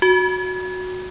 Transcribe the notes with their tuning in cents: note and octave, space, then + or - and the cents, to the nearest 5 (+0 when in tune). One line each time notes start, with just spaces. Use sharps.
F#4 -5